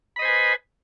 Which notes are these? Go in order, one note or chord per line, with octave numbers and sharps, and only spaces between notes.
B4 C5 D#5 G#5 B5